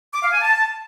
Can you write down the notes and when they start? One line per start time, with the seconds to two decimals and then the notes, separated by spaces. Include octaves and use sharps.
0.13 D6
0.23 F5
0.32 G#5
0.41 A5